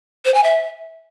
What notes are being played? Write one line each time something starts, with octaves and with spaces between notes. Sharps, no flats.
C5
G#5
E5